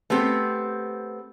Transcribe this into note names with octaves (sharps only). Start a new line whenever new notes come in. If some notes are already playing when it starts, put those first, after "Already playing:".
A3 B3 C4 G4